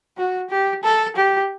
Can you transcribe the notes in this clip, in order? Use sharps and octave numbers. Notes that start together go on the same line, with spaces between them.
F#4
G4
A4
G4